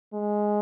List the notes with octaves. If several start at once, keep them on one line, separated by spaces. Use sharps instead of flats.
G#3